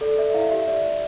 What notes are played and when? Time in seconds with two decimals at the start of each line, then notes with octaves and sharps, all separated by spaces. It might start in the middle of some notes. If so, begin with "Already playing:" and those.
0.01 A4 D5
0.18 D5 E5
0.34 E4 F5
0.50 G4 E5
0.68 D5
0.84 D5